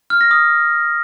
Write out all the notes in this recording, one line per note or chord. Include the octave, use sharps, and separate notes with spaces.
F6
A#6
D#6